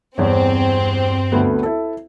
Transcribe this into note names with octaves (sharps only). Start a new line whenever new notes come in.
E2 G2 C4 C#5
D2 A3 B3
E4 A4